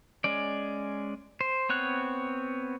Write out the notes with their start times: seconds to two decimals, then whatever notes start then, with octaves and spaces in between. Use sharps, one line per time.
0.24 G#3 C#4 D5
1.41 C5
1.69 B3 C4 C#5 F#6